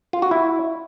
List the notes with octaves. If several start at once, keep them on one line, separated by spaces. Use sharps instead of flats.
F4
F#4
E4